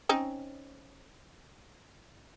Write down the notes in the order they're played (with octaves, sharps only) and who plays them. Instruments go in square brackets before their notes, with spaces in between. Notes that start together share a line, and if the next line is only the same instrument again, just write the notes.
[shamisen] C4 C#4 D#4